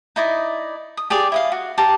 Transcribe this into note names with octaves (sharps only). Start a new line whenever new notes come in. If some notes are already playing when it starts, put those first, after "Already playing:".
D#4 E4 D5 D#5
D#6
G4 G#4 D5 D6
E4 D#5 F5
F#4
G4 A5 A#5